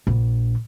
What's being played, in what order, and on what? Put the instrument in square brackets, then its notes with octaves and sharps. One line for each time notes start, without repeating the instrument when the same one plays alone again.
[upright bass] A#1